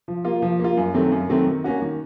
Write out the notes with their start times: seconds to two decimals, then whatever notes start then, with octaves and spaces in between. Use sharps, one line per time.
0.08 F3
0.25 A#3 F4
0.42 F3
0.59 A#3 F4
0.77 F#2
0.94 D#3 F#3 A3 C4
1.12 F#2
1.29 D#3 F#3 A3 C4
1.47 D#3
1.64 A#3 C#4 F#4
1.82 D#3